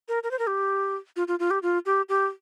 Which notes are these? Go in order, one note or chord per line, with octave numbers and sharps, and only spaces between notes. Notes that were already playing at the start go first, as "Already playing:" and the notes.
A#4
A#4
C5
A#4
G4
F4
F4
F4
G4
F4
G4
G4